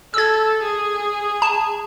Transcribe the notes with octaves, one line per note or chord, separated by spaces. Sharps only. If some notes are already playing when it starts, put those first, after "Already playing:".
A4 E6 G#6
G#4
A5